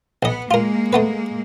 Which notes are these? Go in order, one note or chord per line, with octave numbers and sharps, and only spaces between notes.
B1 B3 D#5
G#3 A#3 F4 A#4
A3 B3 B4